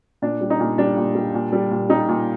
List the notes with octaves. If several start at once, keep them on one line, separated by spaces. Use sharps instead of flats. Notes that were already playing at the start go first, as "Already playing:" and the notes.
A#2 D4
G3
D#4
A#2
G3 D4
A#2
G3
A#2
G3
A#2
G3 D#4
A#2